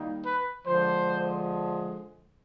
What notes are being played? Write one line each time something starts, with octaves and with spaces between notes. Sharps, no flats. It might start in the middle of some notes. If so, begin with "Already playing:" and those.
Already playing: D#3 G3 A#3 D#4
B4
D3 F3 G#3 C5